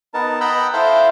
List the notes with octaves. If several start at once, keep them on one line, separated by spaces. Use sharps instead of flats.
B3 D#4 A#4 A5
D#5 F#5 G5 A#5 B5 E6
E4 A4 C5 F5 G5 F6